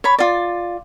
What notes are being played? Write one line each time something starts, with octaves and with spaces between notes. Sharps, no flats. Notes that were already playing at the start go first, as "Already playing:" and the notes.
C#5 B5
F4 D5